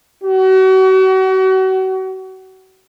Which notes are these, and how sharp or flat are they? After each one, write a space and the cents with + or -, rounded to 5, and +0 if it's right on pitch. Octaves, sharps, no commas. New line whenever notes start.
F#4 +35